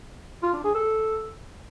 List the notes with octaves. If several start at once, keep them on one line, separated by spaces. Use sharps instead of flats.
F4
D4
G#4
A4